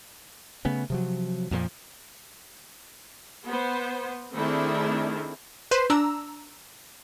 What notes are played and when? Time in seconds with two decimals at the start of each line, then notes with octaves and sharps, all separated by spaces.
0.65 C#3 A3 B3 C#4
0.90 C3 F3 F#3
1.51 F2 A#2 F3
3.46 B3 C5
4.33 D#3 A3 C4 D4 E4 G#4
5.71 B4 C5 C6
5.90 D4 A#5 E6